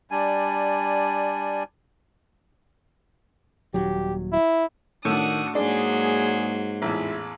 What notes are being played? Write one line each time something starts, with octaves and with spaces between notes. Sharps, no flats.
G3 D4 G#5
D#1 F#3 G4
E4
A2 D#3 D4 F#4 D#6
G#2 F#3 A#3 D4 G#4 C6
A1 E2 E4 F4 E5